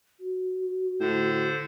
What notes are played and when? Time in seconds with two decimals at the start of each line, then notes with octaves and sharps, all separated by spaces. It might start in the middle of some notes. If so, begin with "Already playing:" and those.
0.19 F#4
1.00 A2 D3 C5